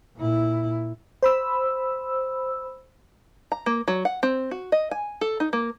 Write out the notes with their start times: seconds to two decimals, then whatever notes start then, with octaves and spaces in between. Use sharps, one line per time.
0.16 A#2 E4
1.23 C5 B5 E6
3.52 A#5
3.66 A#3
3.88 F#3
4.05 F#5
4.23 C4
4.51 F#4
4.72 D#5
4.91 G#5
5.21 A4
5.40 D#4
5.53 A#3